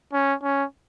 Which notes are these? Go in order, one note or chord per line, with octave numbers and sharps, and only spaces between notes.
C#4
C#4